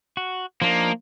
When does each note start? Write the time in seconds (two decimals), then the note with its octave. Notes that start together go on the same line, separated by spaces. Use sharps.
0.17 F#4
0.62 F3 A#3 D4 D#4